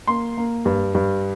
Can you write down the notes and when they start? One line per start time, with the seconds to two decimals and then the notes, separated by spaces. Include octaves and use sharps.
0.07 A#3 C6
0.37 A#3
0.65 G2
0.95 G2